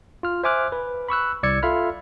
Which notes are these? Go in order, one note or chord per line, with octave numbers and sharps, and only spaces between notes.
F4 F6
C5 E5 G#5 D6 F6 F#6
B4
B5 C#6 E6 F#6
C2 D5 E6 G#6 C#7
F4 A4 E5 F5 B5 F6